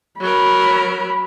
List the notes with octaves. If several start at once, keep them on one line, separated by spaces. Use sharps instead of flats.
F#3 A#4 B5